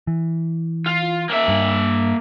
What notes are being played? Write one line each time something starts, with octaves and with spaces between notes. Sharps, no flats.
E3
F4
A#3 E5
G2